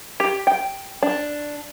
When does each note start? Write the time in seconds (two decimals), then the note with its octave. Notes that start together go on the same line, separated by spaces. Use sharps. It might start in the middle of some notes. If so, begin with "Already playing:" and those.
0.20 G4
0.47 G5
1.03 D4